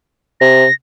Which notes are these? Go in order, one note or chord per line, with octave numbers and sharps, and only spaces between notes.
C3 A#6